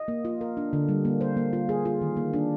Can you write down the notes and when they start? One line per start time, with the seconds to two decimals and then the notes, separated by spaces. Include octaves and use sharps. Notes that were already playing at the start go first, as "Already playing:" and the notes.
Already playing: D#5
0.08 A#3
0.25 F4
0.41 A#4
0.57 D4
0.73 D3
0.89 G3
1.05 A#3
1.21 C5
1.37 A#3
1.53 F4
1.69 G#4
1.85 F4
2.01 D#3
2.17 A#3
2.33 D4